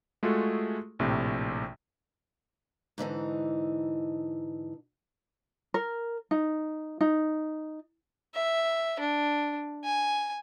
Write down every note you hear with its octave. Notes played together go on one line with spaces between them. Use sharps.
G#3 A3 F4 F#4 G#4 A4
A#1 A2 C3
G#2 D3 E3 D#4
A#4
D#4
D#4
E5
D4
G#5